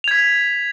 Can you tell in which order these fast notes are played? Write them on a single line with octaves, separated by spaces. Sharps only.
F7 G#6 B6